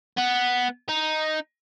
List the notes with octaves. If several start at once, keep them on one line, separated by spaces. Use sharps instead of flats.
B3
D#4